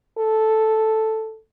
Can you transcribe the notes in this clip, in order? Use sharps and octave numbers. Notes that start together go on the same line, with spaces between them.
A4